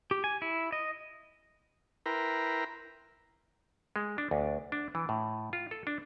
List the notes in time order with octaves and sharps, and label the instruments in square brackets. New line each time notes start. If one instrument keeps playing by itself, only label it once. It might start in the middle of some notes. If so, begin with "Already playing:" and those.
[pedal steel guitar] G4
G#5
E4
D#5
[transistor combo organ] E4 A#4 B4 G5 A#5 C6
[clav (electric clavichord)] G#3
D4
D2
D4
E3
A2
F4
A4
D4